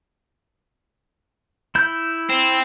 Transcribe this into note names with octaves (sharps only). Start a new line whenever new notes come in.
E4 G6
C4